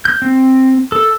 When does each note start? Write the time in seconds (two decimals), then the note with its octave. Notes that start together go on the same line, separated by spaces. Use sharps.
0.05 G6
0.22 C4
0.92 A4